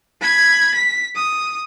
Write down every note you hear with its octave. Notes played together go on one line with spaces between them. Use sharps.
B5 G#6
B6
D#6